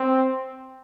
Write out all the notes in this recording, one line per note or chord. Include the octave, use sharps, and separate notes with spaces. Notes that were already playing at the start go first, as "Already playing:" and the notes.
Already playing: C4